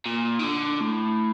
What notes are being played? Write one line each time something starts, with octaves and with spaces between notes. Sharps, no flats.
A#2
D#3
D3
A2